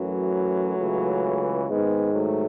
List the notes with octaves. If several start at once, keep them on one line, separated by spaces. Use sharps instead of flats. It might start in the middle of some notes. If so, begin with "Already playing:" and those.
Already playing: F#2 E3 F#3 A3
C#2 C#3 E3
G#2 D#3 G#3 B3
F#3 A3